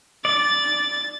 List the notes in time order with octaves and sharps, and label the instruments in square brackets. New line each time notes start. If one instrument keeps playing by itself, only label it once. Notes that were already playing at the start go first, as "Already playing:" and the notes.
[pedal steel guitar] D5 [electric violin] A6